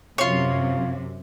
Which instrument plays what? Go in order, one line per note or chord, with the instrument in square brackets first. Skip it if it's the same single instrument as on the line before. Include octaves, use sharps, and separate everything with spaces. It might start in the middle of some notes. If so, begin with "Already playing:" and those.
[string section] F#2 C3 [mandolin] F4 C#5